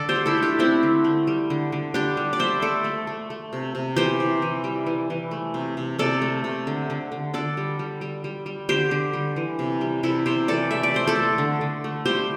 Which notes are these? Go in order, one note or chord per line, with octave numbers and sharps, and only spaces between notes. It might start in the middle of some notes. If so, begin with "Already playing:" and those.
Already playing: D3 A4 D5
G4 C5
A3
E4 A4
A3
D4 G4
A3 C4 E4
D3
A3
G3
D3
D3
G3 D4 G4
G3
D5
G3 C5 E5
A3 A4 D5
A3
A3
A3
C3
C3
E3 G4 C5
C3
E3
G3
E3
E3
A3
C3
C3
C3 A4 D5
A3
C3
D3
D3
D3
D3 A4 D5
G3
G3
G3
G3
G3
D3 G4 C5
D3
G3
E3
C3
G3
C3 E4 A4
C3 G4 C5
E3 A4 D5
A3 E5
D5
A3 C5
A4 D5
A3
D3
D3
A3
G3 G4 C5